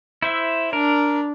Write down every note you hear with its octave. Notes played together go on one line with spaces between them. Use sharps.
E4 C5 E5
D4 A#4